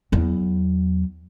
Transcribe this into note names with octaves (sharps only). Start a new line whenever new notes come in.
E2 F#3